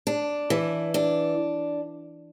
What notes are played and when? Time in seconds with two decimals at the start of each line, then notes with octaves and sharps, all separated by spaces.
0.07 D4
0.50 E3
0.94 D4